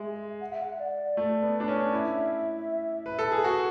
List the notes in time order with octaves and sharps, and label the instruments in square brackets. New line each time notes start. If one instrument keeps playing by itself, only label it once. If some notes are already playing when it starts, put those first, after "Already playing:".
Already playing: [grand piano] G#3 [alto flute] E5
[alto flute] F#5
E5
F#5
D5
[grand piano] A3
B3
D4
C#4
[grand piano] E4 [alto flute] E5
[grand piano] B4
A4
G#4
F#4